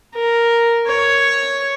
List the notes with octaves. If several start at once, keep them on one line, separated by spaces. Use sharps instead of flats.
A#4
C#5